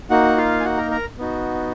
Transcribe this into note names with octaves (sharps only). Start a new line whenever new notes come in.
A#3 D#4 F#4 F#5
F4 F5
G#5
F#4 F#5
A#4 A#5
A#4 A#5
B3 D#4 F#4